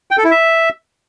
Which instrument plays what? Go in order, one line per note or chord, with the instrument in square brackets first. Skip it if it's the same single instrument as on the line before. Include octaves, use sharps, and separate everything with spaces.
[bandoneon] G5
A4
E4
E5